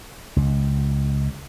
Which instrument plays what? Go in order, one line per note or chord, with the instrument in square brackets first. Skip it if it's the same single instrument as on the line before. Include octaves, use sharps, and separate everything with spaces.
[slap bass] C#2